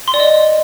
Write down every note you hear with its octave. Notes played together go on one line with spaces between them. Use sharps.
C6
D5
D#5